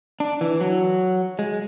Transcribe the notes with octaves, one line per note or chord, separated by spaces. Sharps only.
D4
E3
F#3
G#3